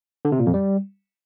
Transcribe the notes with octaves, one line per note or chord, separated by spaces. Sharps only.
D3
C3
A#2
F2
G3